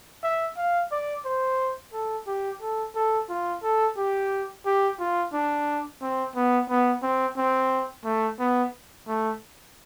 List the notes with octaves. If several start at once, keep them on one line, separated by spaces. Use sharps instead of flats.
E5
F5
D5
C5
A4
G4
A4
A4
F4
A4
G4
G4
F4
D4
C4
B3
B3
C4
C4
A3
B3
A3